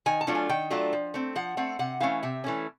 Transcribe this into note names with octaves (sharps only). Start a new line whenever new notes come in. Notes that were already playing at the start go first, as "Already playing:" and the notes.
D#3 G#5
A5
F#3 A3 D4 F4
G#5
D#3 G5
F#3 A3 D4 F4
F3
A3 C4
F3 F#5
A3 C4 F#5
C3 F#5
E3 A3 C#4 F5
C3 E5
E3 A3 C#4